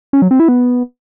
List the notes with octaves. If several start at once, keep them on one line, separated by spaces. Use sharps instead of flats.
C#4
F#3
C4
E4
B3